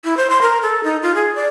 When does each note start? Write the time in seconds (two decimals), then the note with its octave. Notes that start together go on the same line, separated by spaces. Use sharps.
0.04 E4
0.17 C5
0.30 C6
0.42 A#4
0.63 A4
0.84 D#4
1.02 F4
1.15 G#4
1.35 D5